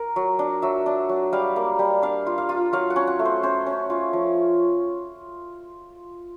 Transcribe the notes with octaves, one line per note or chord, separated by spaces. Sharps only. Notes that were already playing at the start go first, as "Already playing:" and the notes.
Already playing: A#4
F#3
D4
F#3 E5
D4
F#3
G3 F5
A#3
G3
D4 F5
F4
F5
F4
F#3 F5
F#5
C#4
F#5
A3
C5
C#4 C5
C#4
F4
F3